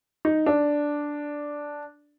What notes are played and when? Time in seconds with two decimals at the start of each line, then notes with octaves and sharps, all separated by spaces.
0.25 D#4
0.46 D4